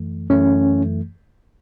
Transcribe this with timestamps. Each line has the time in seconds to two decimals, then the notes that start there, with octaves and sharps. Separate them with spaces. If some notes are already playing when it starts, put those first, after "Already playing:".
Already playing: F#2 E3 A3
0.29 F#2 E3 A3 C#4